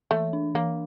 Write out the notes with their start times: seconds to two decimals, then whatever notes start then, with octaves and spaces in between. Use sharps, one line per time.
0.11 E3 A3
0.33 D4
0.55 E3 A#3